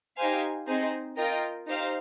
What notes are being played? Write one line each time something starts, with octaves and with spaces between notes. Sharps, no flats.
D#4 G4 C5 F5 G#5
C4 D#4 G#4 C5
F4 A#4 D#5 G5
D#4 G4 C5 F5